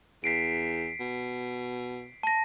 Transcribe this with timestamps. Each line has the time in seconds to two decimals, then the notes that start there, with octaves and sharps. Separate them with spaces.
0.24 E2 B6 C7 D7
1.00 B2
2.23 A5 A#6